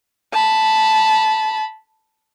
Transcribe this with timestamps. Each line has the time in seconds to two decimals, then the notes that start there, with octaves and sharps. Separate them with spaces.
0.33 A5 B5